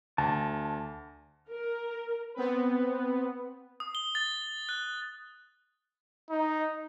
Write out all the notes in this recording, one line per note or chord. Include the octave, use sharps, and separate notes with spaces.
D2 A5
A#4
B3 C4 B4
D#6
G7
A6
F#6
D#4